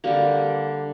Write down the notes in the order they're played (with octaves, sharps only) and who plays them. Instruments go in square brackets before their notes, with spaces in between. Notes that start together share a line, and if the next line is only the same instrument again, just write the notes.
[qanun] D3 G3 A#3 G4